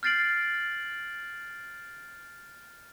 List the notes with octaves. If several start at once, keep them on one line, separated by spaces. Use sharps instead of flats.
F6 G6 A6 C7 D7 F#7